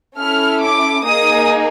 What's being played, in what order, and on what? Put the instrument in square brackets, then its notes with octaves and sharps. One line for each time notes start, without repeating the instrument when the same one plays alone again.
[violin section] C#4 E4 A4 F6
D6
A#3 D#4 G#4 D#6